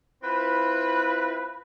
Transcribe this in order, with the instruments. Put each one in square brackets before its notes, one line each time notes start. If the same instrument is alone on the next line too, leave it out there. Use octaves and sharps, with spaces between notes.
[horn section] C4 E4 F4 B4